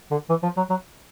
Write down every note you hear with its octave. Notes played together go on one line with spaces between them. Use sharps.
D3
E3
F3
F#3
F#3